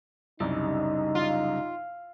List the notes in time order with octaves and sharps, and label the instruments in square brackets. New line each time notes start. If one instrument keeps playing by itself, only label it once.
[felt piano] C2 F#2 [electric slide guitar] C#3 G3 [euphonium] D#4
[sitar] F4